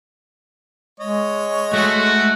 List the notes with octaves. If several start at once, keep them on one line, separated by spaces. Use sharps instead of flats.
G#3 C#5 D#5
G#3 A3 F#4